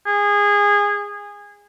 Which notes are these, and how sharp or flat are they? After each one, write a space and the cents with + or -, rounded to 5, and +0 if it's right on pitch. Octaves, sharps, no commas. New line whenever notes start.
G#4 -20